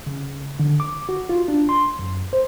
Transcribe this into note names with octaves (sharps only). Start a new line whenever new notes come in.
C#3
D3
D6
F#4
F4
D4
C6
F#2
C5